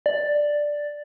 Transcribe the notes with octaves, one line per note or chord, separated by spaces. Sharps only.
D5